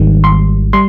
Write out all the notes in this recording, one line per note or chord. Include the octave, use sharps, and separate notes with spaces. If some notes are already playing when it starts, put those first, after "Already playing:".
Already playing: G#1 G#2 D#3 G3
C6
G3 C6